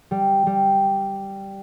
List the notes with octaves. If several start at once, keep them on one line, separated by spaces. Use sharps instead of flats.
G3
G3